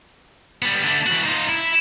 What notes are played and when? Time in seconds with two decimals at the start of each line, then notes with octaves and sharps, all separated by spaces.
0.62 G3 B3
0.84 D3 A3
1.06 E3 F#4
1.25 D#4 F4
1.49 E4